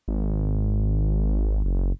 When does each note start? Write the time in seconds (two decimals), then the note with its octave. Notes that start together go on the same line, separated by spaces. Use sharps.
0.08 G#1
1.65 F#1